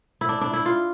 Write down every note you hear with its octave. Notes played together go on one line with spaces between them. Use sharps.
E4
D4
D4
E4
F4